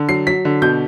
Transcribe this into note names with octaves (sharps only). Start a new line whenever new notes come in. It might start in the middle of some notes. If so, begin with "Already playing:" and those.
Already playing: D3
F#3 C7
F#3 B6
D3
B2 G6